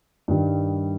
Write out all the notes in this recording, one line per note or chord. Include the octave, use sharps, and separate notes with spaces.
G2 D#3 G3